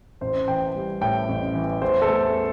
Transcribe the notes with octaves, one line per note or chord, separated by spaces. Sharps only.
A1 C5
E3 G5
G3
A2 G5
A1
E3
E2 C5
A4
A3